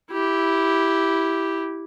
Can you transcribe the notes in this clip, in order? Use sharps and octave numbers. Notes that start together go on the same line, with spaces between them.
E4 G4